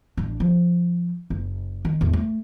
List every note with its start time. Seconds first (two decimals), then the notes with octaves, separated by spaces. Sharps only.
0.17 A1 D4
0.40 F3
1.30 F#1
1.85 D#3
2.01 E2 A2
2.13 A3